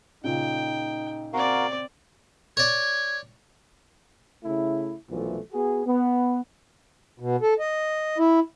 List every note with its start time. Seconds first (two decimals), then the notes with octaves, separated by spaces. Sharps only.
0.24 A#2 C#3 D#4 G5
1.33 C4 F#4 A#4 D5 F5
2.57 C#5 D5 G#6
4.44 C#3 A3 E4
5.10 B1 A#2 E3 F3 A3
5.53 B3 F#4 G#4
5.85 B3
7.20 B2
7.42 A4
7.60 D#5
8.18 E4